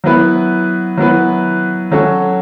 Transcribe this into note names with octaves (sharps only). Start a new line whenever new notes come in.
F#3 B3 E4 B4
F#3 B3 E4 B4
F#3 C#4 F#4 A4 C#5